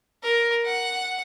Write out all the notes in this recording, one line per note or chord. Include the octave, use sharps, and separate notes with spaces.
A#4
F#5